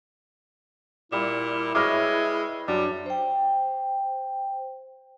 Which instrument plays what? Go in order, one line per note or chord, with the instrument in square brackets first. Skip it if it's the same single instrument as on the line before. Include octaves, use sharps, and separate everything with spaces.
[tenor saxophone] A#2 [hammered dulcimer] G3 [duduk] E4
[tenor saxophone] G#3 [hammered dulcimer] B4 C#5 E5 [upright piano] D6 F6 A#6
[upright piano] F#2 [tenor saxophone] G3 [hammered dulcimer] D4
[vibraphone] C5 G5